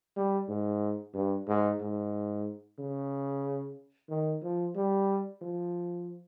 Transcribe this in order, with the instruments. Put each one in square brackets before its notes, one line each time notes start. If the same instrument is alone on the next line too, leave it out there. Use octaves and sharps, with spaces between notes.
[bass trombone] G3
G#2
G2
G#2
G#2
C#3
D#3
F3
G3
F3